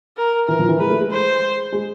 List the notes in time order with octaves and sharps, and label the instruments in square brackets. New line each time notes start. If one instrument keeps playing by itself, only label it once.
[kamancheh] A#4
[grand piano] E3 [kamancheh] A#4
[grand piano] F3
E3
[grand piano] G#3 [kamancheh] B4
[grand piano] A3
G#3
[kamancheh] C5
[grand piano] G#3